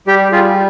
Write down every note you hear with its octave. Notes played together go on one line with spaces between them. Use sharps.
G3 G4
G3 F4 G#4